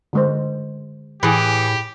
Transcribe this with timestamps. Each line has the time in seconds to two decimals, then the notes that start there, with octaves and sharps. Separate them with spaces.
0.13 D3 G#3 C5
1.23 A2 E3 G4 G#4